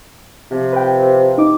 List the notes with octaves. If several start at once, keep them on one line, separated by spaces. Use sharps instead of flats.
C3 F3
B4 G5
D#4 D6